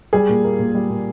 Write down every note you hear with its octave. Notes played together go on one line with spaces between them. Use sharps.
G3 G#4
A#2
A#3
A#2
G3
A#2